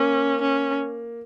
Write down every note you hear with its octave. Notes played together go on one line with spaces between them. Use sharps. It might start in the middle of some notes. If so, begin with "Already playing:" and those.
Already playing: A#3 C#4
C#4